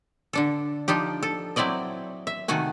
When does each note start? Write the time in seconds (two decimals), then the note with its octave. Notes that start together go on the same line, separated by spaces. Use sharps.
0.33 D3 D4 A4
0.88 F3 D4 D#4 G4
1.23 A4
1.56 F#3 C4 E4 D5 D#5
2.27 E5
2.48 C3 D#3 A3 F#4 G#5